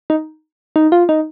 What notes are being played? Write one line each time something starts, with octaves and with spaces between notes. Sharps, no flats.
D#4
D#4
F4
D#4